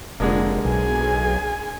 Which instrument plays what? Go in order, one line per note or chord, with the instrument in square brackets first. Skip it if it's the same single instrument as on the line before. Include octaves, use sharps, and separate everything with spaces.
[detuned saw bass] F1 [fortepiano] D3 G#3 A#3
[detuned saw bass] B1 [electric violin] G#4 G#5